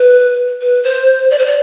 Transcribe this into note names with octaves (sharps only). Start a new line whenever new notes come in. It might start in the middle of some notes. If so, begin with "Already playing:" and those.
Already playing: B4
B4
C5
D5
C5
D5